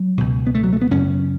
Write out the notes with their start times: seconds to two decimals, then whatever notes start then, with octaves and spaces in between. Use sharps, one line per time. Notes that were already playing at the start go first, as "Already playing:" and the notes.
Already playing: F#3
0.18 C#2 B2
0.47 B3
0.55 A3
0.64 F#3
0.73 A3
0.82 B3
0.91 F#2 C#3 C#4